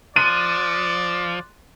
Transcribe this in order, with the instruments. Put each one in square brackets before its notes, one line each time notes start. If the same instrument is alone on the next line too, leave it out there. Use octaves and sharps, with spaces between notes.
[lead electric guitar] F3 [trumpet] D5 [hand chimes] C6 F#6 A6 [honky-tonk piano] D#7